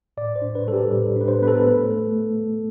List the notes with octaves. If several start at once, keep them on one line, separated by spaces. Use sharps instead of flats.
A2 D5
C5
D4
B4
G3 A4
G4
A2 A4
D4 B4
C5
B3 B4
A4
A3
A3